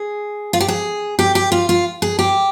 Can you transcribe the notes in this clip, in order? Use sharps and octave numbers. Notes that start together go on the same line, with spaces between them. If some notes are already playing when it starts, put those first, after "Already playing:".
Already playing: G#4
F4
G4
G#4
G4
G4
F4
F4
G#4
G4